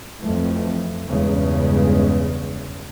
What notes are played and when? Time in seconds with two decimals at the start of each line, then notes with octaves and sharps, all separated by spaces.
0.21 F2 E3 A3
1.09 E2 G2 C#3 G#3